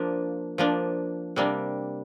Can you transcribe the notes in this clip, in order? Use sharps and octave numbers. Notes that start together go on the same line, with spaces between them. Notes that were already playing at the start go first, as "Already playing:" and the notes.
Already playing: F3 A#3 D4
F3 A#3 D4
C3 G3 A#3 D4